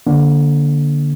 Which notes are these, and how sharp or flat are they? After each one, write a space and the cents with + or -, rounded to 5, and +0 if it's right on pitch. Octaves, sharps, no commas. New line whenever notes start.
D3 +0 A#3 +25